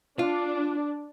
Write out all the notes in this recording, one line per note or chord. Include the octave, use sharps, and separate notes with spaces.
D4 F4